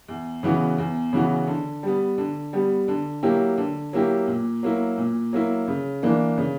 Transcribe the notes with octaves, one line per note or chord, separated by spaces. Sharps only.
E2
C#3 E3 B3 F#4
E2
C#3 E3 B3 F#4
D3
G3 B3
D3
G3 B3
D3
F#3 A#3 E4 G4
D3
F#3 A#3 E4 G4
A#2
F#3 A#3 E4
A#2
F#3 A#3 E4
C#3
E3 A#3 D4
C#3